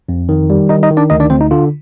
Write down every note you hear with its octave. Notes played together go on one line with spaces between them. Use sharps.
F2
D#3
G3
D#3 D#4 D#5
D#4 D#5
D#3
D4 D5
D2 D#4 D#5
D4 D5
D2 C4 C5
D#4
D3 F4